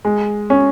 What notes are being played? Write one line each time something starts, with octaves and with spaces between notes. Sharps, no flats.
G#3
C#4